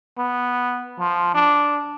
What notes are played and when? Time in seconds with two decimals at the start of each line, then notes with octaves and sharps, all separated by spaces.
0.18 B3
0.99 F3
1.35 D4